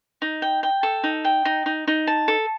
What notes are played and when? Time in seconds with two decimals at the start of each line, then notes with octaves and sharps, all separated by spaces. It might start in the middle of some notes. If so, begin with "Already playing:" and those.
0.22 D#4
0.42 G5
0.63 G5
0.83 A4
1.04 D#4
1.25 G5
1.45 D#4
1.66 D#4
1.87 D#4
2.07 A5
2.28 A4